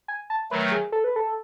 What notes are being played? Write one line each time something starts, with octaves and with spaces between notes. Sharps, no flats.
G#5
A5
D#3 F#3 A3 B4
G#4
A4
B4
A4